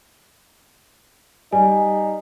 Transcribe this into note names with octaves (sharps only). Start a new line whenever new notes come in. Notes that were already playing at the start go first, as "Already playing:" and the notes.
G3 D#4 G#5